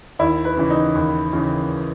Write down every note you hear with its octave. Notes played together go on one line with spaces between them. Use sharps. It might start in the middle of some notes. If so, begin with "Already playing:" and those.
D#2 E4
B4
C#3 E3
D#4
D#2
C#3 E3